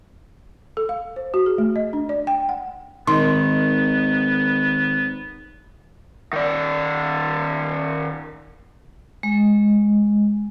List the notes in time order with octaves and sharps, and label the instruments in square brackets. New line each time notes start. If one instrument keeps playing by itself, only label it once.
[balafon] A4
F5
C5
F#4
G#4
A3
D#5
D4
D5
G5
F#5
[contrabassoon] G#1 [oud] D#3 [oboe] B3 [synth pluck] C6
[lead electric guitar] D#3 D5
[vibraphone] G#3